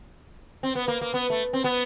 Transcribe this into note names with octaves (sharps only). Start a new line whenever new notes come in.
C4
B3
A#3
A#3
B3
A3
C4
B3